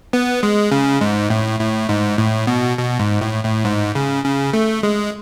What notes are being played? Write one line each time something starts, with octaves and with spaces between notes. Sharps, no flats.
B3
G#3
C#3
G#2
A2
A2
G#2
A2
B2
B2
G#2
A2
A2
G#2
C#3
C#3
A3
G#3